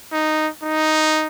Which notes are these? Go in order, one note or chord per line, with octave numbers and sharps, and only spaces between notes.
D#4
D#4